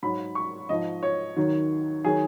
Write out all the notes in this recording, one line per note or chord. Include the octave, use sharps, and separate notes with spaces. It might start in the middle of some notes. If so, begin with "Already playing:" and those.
G#2 F#3 B5
C#6
G#2 F3 D#5
C#5
D#2 D#3 F#3
D#3 F#3 G#4